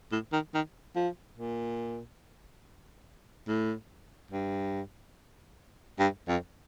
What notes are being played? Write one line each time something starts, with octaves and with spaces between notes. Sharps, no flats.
A2
D#3
D#3
F3
A#2
A2
G2
G2
F2